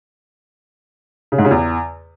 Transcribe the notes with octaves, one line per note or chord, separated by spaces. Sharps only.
C#3
G#2
C#3
E2